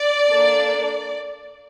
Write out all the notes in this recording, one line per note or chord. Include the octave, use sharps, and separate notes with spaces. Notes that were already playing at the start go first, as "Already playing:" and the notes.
Already playing: D5
A#3 D4 A4